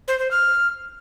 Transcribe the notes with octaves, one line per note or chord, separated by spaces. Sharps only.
C5
C5
F6